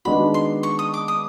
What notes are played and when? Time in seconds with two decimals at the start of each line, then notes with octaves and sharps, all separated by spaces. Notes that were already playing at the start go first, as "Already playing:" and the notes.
0.05 D#3 G#3 B3 D4 F#4 B5
0.34 C6
0.63 C#6
0.79 D#6
0.94 D6
1.08 D#6